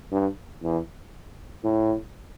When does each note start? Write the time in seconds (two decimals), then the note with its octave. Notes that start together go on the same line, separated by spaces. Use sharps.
0.11 G2
0.63 E2
1.64 A2